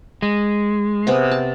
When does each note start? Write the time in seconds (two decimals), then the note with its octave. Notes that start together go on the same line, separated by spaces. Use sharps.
0.22 G#3
1.07 C3 B3 G#4
1.31 A5